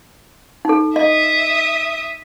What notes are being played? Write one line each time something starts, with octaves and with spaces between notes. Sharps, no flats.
D#4 A4
D#5 E5 D#6